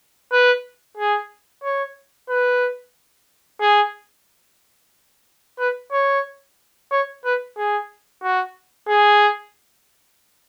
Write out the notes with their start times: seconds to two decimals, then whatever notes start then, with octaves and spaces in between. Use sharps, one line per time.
0.32 B4
0.97 G#4
1.64 C#5
2.30 B4
3.61 G#4
5.59 B4
5.92 C#5
6.92 C#5
7.25 B4
7.58 G#4
8.23 F#4
8.89 G#4